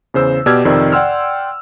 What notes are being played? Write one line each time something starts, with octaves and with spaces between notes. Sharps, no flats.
E2 C#3 C5 E6
B2 G4 D5 E6 F6 G#6
F2 C3 D#3 D5
D5 F#5 G5 C6 E6 F6